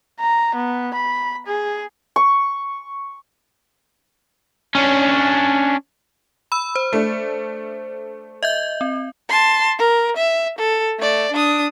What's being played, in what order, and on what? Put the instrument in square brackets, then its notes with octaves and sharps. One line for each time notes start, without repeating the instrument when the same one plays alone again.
[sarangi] A#5
B3
B5
G#4
[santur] C#6
[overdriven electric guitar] C#4 D4
[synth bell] B5 E6
C5
[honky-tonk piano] A3 D4
[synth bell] D#5 E5 G6
C4
[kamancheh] A5 C6
A#4
E5
A4
A3 D5
D4 D#6